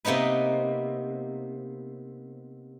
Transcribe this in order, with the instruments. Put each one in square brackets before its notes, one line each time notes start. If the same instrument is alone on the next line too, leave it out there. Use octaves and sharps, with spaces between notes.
[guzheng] C3 A#3 B3 D#4 B4